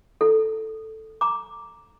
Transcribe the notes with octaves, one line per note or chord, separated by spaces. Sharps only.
E4 A4
A#5 D6